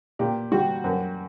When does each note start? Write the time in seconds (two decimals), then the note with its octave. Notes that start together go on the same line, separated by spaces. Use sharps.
0.19 A#2 G4
0.52 G3 F#4
0.84 F#2